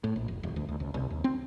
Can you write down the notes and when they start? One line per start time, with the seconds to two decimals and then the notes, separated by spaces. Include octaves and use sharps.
0.04 A2
0.16 A#1
0.28 F1
0.43 D#1
0.56 D2
0.69 D2
0.80 C#2
0.94 C2
1.10 D#2
1.24 C4